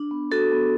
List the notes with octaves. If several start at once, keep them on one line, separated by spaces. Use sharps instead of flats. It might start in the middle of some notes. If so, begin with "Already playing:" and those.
Already playing: D4
B3
F#4 A4
B3